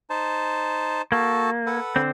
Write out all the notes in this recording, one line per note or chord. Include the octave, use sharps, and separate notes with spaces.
D#4 C5 A5
A#3 F#4 A4 A5
A4 B4 F#5
D3 C4